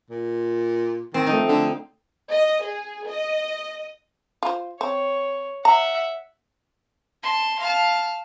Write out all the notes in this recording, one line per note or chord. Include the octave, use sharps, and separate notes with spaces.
A#2
D2 D#3 C4
F3 G3 A3 D#4
D3
D#5
G#4
D#5
F4 C5
C4 C#5
E5 F#5 A#5
A5 C6
F5 A5